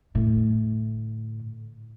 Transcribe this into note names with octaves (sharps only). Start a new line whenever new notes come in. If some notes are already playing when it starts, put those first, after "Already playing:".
A2 D3